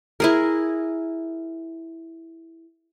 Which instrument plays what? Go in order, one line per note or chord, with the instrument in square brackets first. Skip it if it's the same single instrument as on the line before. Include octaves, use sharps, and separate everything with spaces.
[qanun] E4 G#4 A#4